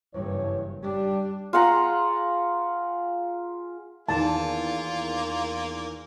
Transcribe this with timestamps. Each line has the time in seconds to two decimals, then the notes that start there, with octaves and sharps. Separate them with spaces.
0.14 F#1 G2 E3 C#5
0.83 G3 D4
1.53 F4 G#4 F#5 A#5
4.09 E2 D#3 A#3 F4 A5